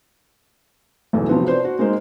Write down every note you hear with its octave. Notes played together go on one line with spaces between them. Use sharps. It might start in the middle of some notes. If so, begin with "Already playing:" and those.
B1 E2 A4
C3 F3 F#3 B3 C4
C5 D5
F#4
G#3 A#3 D#4 C5